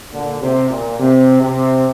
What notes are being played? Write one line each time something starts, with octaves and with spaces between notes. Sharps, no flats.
A#2 D3
C3
A#2
C3
C3